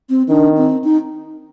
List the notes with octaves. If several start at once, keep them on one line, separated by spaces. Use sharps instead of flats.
C4
D#3 D4
C4
D#4